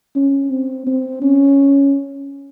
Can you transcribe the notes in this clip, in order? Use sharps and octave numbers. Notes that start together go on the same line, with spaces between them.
C#4
C4
C4
C#4